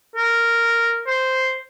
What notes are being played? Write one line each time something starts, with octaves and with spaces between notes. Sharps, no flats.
A#4
C5